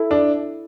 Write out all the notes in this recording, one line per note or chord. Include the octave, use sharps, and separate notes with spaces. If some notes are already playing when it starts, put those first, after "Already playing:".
Already playing: E4 A4 E5
D4